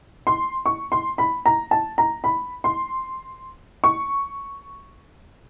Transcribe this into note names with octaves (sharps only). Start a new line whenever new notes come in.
C6
C#6
C6
B5
A#5
A5
A#5
B5
C6
C#6